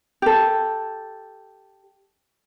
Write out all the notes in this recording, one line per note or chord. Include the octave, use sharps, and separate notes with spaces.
G4 A4